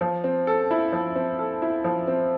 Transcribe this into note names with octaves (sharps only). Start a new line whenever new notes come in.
F3
C4
A4
E4
F3
C4
A4
E4
F3
C4